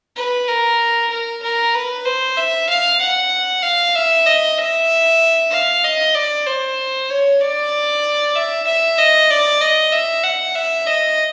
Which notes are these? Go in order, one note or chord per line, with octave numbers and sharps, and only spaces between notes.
B4
A#4
A#4
A#4
B4
C5
E5
F5
F#5
F5
E5
D#5
E5
F5
D#5
D5
C5
C#5
D5
E5
E5
D#5
D5
D#5
E5
F#5
E5
D#5